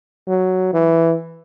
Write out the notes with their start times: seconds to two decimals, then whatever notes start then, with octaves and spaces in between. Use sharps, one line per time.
0.27 F#3
0.73 E3